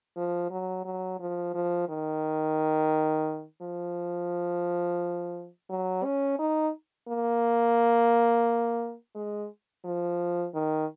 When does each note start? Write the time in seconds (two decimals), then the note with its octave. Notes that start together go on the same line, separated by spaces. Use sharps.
0.16 F3
0.51 F#3
0.85 F#3
1.20 F3
1.54 F3
1.89 D#3
3.62 F3
5.70 F#3
6.04 C#4
6.39 D#4
7.08 A#3
9.15 G#3
9.85 F3
10.54 D#3